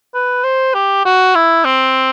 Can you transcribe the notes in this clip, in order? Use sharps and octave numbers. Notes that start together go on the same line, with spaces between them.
B4
C5
G4
F#4
E4
C4